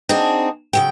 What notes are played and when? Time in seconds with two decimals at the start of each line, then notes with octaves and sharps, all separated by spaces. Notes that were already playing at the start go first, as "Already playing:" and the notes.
0.09 C4 D4 D#4 F#4 G#4
0.73 C#3 F#3 G5